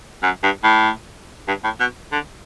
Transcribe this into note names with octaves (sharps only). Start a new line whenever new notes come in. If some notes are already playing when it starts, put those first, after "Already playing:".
F#2
G2
A2
G2
A2
B2
D3